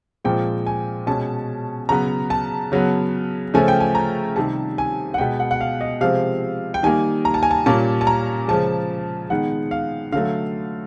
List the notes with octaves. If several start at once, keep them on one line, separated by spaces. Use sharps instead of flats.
A#2 F3 G#3 C4 G5
G#5
B2 G#3 C#4 A5
C#3 F#3 B3 A#5
A5
C#3 F#3 B3
C#3 F3 A3 C#4 G#5
G5
G#5
A#5
C3 D#3 G3 A5
G#5
F#5
B2 G#3 B3 G5
F#5
F#5
F5
D#5
C3 F3 G#3 C4 F5
G5
D#3 G3 A#3 G#5
A#5
A5
G#5
A5
A#2 G3 A#3 C#4 A5
A5
A#5
C#3 F3 G#3 A5
D#3 G#3 B3 F#5
F5
D3 F#3 A3 F5